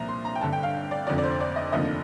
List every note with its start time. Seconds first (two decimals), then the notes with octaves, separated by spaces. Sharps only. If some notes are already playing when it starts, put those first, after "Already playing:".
Already playing: C2 A#2 F3 A#5
0.08 C6
0.25 A#5
0.35 G5
0.41 G1 G2 D3 A5
0.53 G5
0.63 F5
0.91 D5
1.07 F1 F2 D3 F3 D5
1.18 D5
1.24 C5
1.41 D5
1.56 D#5
1.72 F1 D#2 D3 F3 D#5